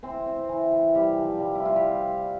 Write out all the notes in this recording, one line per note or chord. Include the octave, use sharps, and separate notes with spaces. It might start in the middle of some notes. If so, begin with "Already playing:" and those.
E3 C4 C5
C4
E3
E3
C3 G3 G4
F3
G3
E4
G3 F4
G4